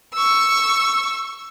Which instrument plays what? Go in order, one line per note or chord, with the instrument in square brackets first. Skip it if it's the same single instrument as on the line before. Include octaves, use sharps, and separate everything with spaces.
[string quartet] C#6 E6